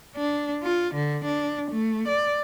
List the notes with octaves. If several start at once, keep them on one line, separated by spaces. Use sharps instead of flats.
D4
F4
D3
D4
A3
D5